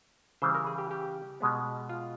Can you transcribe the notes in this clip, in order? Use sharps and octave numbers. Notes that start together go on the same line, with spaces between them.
C#3 E3 G3 C5
A#4
G#4
G4
G4
B2 G#3 B3
F4